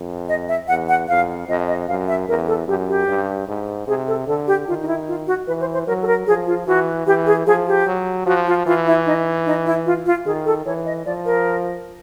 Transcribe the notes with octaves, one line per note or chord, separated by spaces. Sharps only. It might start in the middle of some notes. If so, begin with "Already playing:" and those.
Already playing: F2
D#5
E5
E2 F#5
F#5
F2 F5
F2 D#5
D#5
F#2 F5
E5
E2 A#4
A4
F#2 G4
G4
G2
G#2
C3 G#4
A4
D3 A4
G4
D#3 F4
D#4
E4
F4
F#4
E3 B4
C5
C5
F#3 A#4
A4
A#4
F3 G#4
F4
E3 F#4
E3 G4
G#4
F3 G#4
G4
F#3
F3 F#4
F4
E3 F4
E4
D#4
D#4
E4
F4
F4
D#3 G#4
A4
E3 C#5
D#5
F3 D5
A#4